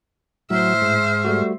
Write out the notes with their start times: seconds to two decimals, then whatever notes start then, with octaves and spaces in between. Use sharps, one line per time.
0.50 A2 F#3 C5 E5 F6
0.82 G#2
1.24 G3 A3 F#4